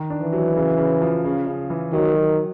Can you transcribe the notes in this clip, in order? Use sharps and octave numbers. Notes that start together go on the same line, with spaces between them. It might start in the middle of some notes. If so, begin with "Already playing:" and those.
Already playing: D#3
D4
E3
F#3
C#3
C#3
F3
C#3
C#3
E3
D#3 F#3
F#3